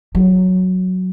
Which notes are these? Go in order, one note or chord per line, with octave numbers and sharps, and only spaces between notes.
F#3